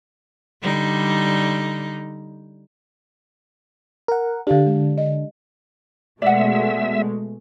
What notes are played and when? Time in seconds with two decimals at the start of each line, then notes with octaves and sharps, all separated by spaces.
0.63 D3 G3 D#4
4.08 A#4 F#5
4.47 D3 D4 G4 F5
4.66 G#3
4.98 D#5
6.22 B2 G#3 A3 D5 E5 F#5